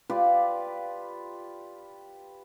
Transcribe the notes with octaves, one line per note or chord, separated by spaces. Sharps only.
F4 G4 B4 D5